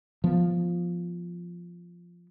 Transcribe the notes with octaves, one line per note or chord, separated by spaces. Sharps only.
F3 B3